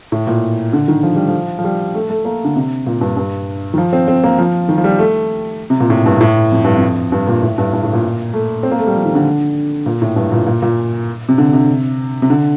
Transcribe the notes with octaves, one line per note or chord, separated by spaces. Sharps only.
A2
A#2
D3
D#3
F3
G3
F3
F3
G3
A3
A3
A#3
D3
C3
A#2
G2
G2
D#3
F3
C4
C4
A#3
F3
D#3
F3
G3
A3
C3
A#2
A2
G2
A2
F2
G2
F2
G2
A#2
A2
G2
G2
A2
A#2
A3
C4
A#3
A3
G3
F3
D#3
D3
A#2
A2
G2
A#2
A#2
A#2
C3
D3
C3
C3
D3